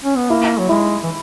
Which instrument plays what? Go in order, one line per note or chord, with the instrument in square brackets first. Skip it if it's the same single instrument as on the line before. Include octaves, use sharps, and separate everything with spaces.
[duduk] C#4
B3
[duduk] A#3 [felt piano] E4
[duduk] F#3
[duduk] G#3 [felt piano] E4
[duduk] E3